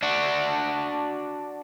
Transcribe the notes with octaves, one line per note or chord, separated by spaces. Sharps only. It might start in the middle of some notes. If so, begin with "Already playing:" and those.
D4 F#4